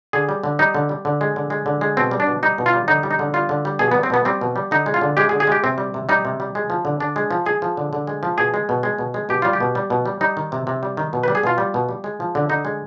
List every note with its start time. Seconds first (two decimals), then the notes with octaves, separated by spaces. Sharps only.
0.13 D3 G#4
0.29 G3
0.43 D3
0.59 G3 D#4
0.74 D3
0.89 G3
1.05 D3
1.21 G#3
1.36 D3
1.50 G#3
1.66 D3
1.81 G#3
1.97 B2 C4
2.11 G3
2.20 D4
2.27 B2
2.43 G3 D#4
2.58 B2
2.66 F4
2.73 G3
2.88 D3 D#4
3.03 G3
3.11 D#4
3.19 D3
3.34 G3 F4
3.49 D3
3.65 G3
3.79 B2 G#4
3.91 B3
3.95 G3
4.03 C4
4.10 B2 B3
4.25 G3 C4
4.41 B2
4.56 G3
4.71 D3 D#4
4.86 G#3
4.94 F4
5.01 D3
5.17 G#3 G4
5.29 G#4
5.32 D3
5.40 G#4
5.47 G#3 G4
5.64 C3 C4
5.78 G3
5.94 C3
6.09 G3 D#4
6.25 C3
6.40 G3
6.55 G#3
6.70 F3
6.85 D3
7.00 D3 D4
7.16 G#3
7.31 F3
7.46 G#3 G#4
7.62 F3
7.77 D3
7.93 D3
8.07 G#3
8.23 F3
8.38 B2 G#4
8.54 G#3
8.69 B2
8.83 G#3
8.99 B2
9.14 G#3
9.29 B2 G4
9.42 G3 F4
9.53 G4
9.60 B2
9.75 G3
9.90 B2
10.06 G3
10.21 G3 D#4
10.37 D#3
10.52 C3
10.67 C3
10.83 G3
10.97 D#3
11.13 B2
11.23 B4
11.28 G3
11.35 G#4
11.43 B2 F4
11.58 G3
11.74 B2
11.89 G3
12.04 G#3
12.20 F3
12.35 D3
12.49 D3 D#4
12.65 G#3